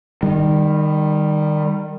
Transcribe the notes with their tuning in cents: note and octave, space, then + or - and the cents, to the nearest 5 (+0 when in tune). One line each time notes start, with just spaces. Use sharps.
D#3 -15 G3 +20